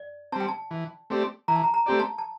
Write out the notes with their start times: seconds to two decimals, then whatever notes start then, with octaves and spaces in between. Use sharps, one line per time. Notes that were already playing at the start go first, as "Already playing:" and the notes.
Already playing: D5
0.32 C4 A5
0.36 G3 G5
0.48 A5
0.71 E3
1.10 A3 C4 G4 D5
1.48 E3 A#5
1.56 A5
1.64 A#5
1.74 A#5
1.86 A3 C4 G4 D5
2.00 A5
2.18 A5